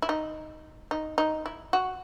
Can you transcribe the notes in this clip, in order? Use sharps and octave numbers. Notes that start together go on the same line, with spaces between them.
E4
D#4
D#4
D#4
E4
F#4